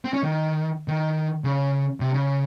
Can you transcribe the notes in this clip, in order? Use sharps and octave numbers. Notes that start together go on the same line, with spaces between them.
C4
C#4
D#3
D#3
C#3
C3
C#3